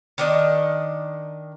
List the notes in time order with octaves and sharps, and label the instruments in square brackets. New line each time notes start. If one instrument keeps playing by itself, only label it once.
[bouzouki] D#3 D4 D#5